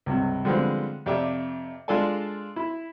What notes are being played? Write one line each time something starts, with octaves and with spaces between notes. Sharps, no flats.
C#2 G2 C3
D3 F3 G3 G#3 B3 C4
F2 C3 G4 D5 E5 D6
G#3 D4 F4 A4 D5 G#5
E4